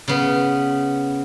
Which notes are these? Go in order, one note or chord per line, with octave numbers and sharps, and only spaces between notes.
C#3 B3